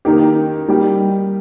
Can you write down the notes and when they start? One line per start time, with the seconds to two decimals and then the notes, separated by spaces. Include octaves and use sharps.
0.05 D#3 A#3 D#4 G4
0.68 G3 A#3 D#4 G4